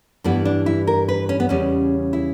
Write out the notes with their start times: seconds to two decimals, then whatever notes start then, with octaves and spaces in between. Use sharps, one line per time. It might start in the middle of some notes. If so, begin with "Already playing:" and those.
0.24 G2 E3 G3 B3
0.45 D4
0.66 E4
0.87 A#4
1.09 B4
1.29 C#4
1.40 B3
1.49 E2 C#3 G3 C#4
2.13 E4